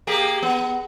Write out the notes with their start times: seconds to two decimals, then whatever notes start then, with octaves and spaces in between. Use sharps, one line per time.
0.07 A#3 G4 G#4
0.42 B3